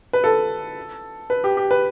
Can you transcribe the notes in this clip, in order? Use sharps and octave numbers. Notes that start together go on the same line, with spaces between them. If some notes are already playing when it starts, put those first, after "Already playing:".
B4
A4
B4
G4
G4
B4